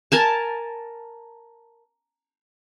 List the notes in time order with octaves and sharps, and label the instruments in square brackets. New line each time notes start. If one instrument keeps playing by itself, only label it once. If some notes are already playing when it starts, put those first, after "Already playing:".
[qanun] A#4 G#5 A5